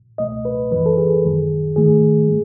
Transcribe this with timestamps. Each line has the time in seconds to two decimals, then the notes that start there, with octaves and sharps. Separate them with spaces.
0.18 C#2 B2 A3 D#5
0.45 B4
0.71 F#2 E3 G#3 B4
0.86 A4
0.98 G#4
1.24 F#2 D#3 G#3
1.76 G#2 D#3 A3 G#4
2.28 G#3